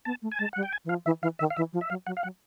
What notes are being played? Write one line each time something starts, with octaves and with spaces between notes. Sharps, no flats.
B3 A5
A3
G#5
G#3 A5
G3 F#5
G5
G#5
E3
F3 F5
E3 E5
E3 F5
D#3 E5
F5
E3 E5
F3
E5
F#3 F5
F#3 F#5
F5
F#3 F#5